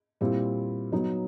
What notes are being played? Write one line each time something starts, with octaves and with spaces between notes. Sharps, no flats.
A#2 G3 C4 E4
F#3 B3 D#4